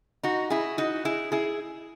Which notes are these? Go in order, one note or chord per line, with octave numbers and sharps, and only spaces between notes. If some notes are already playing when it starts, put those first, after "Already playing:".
D#4 F#4
E4 G#4
D#4 F#4
E4 G#4
E4 G#4